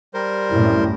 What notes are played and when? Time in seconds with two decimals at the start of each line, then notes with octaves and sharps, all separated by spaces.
0.14 G3 A#4 C5
0.51 C2 F#2 A2 E4